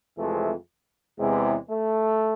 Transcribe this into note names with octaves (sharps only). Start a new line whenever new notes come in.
F2 C3 E3 G#3 A3
E2 C3 E3 G#3
A3